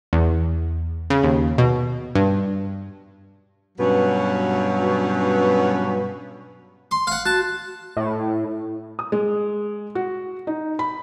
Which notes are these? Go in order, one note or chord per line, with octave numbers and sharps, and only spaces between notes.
E2
C#3
D#2
B2
G2
G2 B2 F#3 C#4 B4 F#5
C6
F5 F#5
F#4 A5
A2
D#6
G#3
F#4
D#4
B5